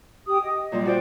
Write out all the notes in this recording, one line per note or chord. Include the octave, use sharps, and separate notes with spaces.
G4 D#6
D#5
A#2 G3 F4
F#4 C5 D5 G5